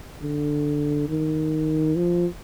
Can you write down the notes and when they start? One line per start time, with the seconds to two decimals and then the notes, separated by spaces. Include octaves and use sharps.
0.22 D3
1.09 D#3
1.96 F3